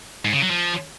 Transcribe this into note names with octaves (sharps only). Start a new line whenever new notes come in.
G#2
C#3
F#3
F3